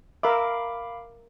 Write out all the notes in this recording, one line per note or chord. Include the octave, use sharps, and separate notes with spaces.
A#4 E5 F5 B5 D6